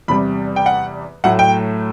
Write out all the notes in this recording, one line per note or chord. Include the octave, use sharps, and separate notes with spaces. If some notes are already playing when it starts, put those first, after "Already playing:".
E2 C3 G3 B5
G5
F#5
A2 F#3 A3 F#5
G5